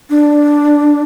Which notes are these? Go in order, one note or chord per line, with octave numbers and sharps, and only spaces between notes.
D4